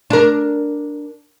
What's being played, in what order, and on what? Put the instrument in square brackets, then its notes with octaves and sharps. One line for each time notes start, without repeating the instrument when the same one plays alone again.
[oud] D4 A#4